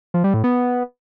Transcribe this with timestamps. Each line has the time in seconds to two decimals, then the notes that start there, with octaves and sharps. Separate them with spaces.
0.14 F3
0.24 G3
0.34 A2
0.44 B3